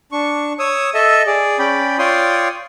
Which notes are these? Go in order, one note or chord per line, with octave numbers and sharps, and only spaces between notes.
D4 C#6
C#5 D#6 E6
A4 D#5 E5 A5 E6
G#4 D5
C#4 D5 G5 B5
F4 C#5 D5 G5 C6 D#6